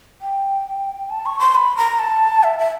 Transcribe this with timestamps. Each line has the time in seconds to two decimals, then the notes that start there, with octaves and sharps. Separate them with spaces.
0.21 G5
1.10 A5
1.26 C#6
1.39 C6
1.55 B5
1.77 A#5
1.99 A5
2.44 E5
2.59 E5